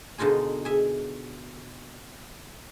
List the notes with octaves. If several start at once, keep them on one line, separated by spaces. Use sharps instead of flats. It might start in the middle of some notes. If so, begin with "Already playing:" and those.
B2 D3 D#4 F4 G#4
G#4 E5